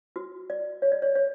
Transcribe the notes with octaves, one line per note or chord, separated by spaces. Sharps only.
F#4
D5
C#5
D5
C#5
C#5